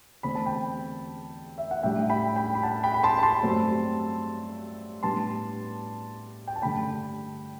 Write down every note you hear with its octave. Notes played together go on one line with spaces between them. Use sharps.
E2 D3 A3 C4 B5
A5
G5 B5
E5
F#5
A2 G3 D4 E5 G5
G5 B5
G5 B5
B5
F#5 A5
G5 B5
B5
A5 C6
B5
A5 C6
G2 F#3 A3 C4
A2 G3 B3 D4 A5 C6
G5
A5
G2 D3 A3 G5 B5